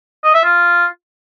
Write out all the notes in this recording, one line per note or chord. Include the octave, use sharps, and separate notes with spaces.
D#5
E5
F4